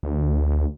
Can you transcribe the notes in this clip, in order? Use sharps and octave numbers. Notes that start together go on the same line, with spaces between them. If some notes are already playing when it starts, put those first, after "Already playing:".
D2